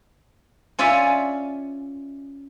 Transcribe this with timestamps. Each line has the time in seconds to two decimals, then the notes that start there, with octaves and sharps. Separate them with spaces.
0.79 C#4 F4 C#5 D5 E5 G#5